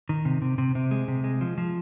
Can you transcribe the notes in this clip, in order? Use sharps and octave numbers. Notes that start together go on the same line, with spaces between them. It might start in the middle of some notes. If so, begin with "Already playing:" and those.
D#3
C3
C3
C3
C3
G#3
C3
G#3
F3
F3